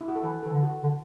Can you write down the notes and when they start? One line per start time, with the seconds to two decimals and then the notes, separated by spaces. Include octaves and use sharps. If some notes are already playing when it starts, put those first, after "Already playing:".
0.01 E4
0.08 F#4
0.15 A4
0.23 E3 B4
0.43 E3 A4
0.53 D3
0.63 F#4
0.83 D3